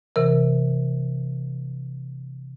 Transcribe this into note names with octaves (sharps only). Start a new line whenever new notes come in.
C3 E3 A#4